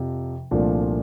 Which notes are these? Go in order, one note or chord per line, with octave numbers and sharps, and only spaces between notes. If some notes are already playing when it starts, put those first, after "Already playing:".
Already playing: F2 C3 F3
C2 A#2 F3 A3 D4